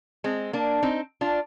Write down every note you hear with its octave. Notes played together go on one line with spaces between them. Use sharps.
G#3 C4
A#3 D4
C4 D#4
D4 F4